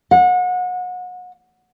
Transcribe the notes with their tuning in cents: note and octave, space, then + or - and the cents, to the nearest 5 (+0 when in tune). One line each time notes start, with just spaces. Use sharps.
F#5 -30